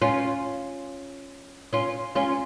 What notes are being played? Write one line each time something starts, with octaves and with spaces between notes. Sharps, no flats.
C#4 F4
C#4 F4
C#4 F4